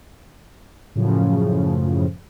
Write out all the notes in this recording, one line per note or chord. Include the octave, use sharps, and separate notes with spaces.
F#2 A2 C#3 F3